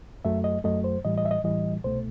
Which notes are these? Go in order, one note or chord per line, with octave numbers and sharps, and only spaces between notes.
F#2 F#3 A3 E5
D#5
F#2 F#3 A3 D#5
C5
A2 E3 G3 D#5
D#5
E5
D#5
A2 E3 G3 D#5
C2 B2 A3 C5